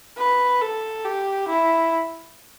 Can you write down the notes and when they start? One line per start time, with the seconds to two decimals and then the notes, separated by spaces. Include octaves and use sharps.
0.18 B4
0.61 A4
1.05 G4
1.48 E4